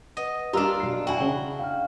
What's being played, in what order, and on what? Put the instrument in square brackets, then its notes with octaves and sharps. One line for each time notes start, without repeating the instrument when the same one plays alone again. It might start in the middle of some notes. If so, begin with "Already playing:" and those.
[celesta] B4 F#5 [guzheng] D#5
[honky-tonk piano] G3 A#4 [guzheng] D4 F4 [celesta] A#5 E6
[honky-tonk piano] B1 C7
[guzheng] E4 F#4 [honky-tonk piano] G5 G#5
[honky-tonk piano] C#3 [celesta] D4 G7
[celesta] F5 F6 [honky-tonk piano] G5